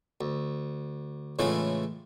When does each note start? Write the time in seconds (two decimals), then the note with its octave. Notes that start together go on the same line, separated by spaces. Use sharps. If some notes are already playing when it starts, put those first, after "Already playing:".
0.21 D2
1.39 A2 C#3 E3 G#3 A3 F4